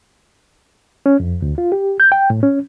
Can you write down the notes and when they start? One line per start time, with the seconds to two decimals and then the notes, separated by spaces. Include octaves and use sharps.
1.06 C#4
1.20 F2
1.42 D2
1.58 F4
1.72 G4
2.00 G6
2.12 G5
2.30 A2
2.43 C#4